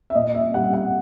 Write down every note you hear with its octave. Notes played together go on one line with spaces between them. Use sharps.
E5
A#2 D#5
E5
G3 F#5
F#5